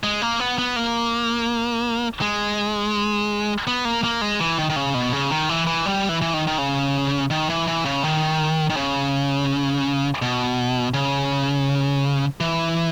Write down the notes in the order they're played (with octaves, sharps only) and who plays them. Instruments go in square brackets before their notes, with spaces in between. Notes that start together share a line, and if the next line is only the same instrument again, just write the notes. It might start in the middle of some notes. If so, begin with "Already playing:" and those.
[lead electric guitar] G#3
A#3
B3
B3
A#3
G#3
B3
A#3
A#3
G#3
E3
D#3
D#3
C#3
B2
C#3
D#3
E3
E3
G3
E3
E3
D#3
D#3
C#3
D#3
E3
E3
C#3
D#3
D#3
C#3
B2
C#3
E3